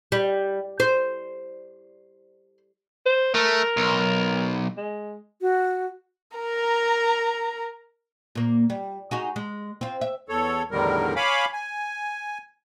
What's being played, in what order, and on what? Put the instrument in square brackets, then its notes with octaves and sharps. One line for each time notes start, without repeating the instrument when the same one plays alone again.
[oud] G3
C5
[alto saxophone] C5
[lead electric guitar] A3 [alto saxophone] A#4
[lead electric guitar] B1
[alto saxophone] G#3
[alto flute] F#4
[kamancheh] A#4 A#5
[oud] A#2 A#3
G3
D#4 F#4 G#4
G#3
C4 F4
E5
[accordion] E2 A4 C#5
E2 A2 D3 D#3 G3 A#4
C#5 F5 G#5 B5 D6
G#5